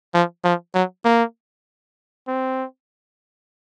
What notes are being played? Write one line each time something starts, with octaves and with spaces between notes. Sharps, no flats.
F3
F3
F#3
A#3
C4